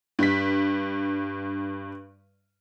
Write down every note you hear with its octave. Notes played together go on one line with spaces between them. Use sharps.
G2 B6